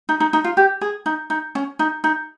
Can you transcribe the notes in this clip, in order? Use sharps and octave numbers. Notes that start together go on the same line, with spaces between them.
D#4
D#4
D#4
F4
G4
G#4
D#4
D#4
C#4
D#4
D#4